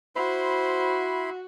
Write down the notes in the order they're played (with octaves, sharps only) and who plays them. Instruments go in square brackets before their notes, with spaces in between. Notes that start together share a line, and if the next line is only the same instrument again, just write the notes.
[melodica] E4 B5 C6 [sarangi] F#4 [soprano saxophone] C5